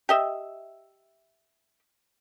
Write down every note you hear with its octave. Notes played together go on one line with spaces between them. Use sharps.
G4 D#5 E5